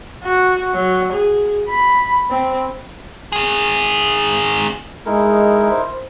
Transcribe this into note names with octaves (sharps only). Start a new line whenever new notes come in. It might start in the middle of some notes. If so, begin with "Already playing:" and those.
F#4
F#3
G#4
B5
C4
D#3 G#4
G#3 D#4 E4 A#4
C5